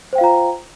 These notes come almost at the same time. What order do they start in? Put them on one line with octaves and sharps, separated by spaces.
C5 G5 F5 F4 A#5